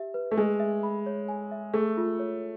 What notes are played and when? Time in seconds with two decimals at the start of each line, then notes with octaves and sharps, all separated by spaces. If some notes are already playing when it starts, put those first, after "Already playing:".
Already playing: G4 E5
0.14 B4
0.31 A3
0.37 G#3 G#5
0.60 E5
0.83 B5
1.06 C#5
1.28 G#5
1.51 E5
1.74 A3 G#4
1.97 F4
2.19 C#5